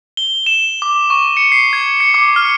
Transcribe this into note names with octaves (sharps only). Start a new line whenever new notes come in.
G7
E7
D6
C#6
C#7
C7
G#6
C#7
D6
F6